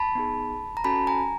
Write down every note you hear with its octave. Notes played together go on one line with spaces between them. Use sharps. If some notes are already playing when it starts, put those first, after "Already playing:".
Already playing: A5 B5
B3 D#4 G#4
A#5
C#4 F#4 A4 A5 B5
G#5 A#5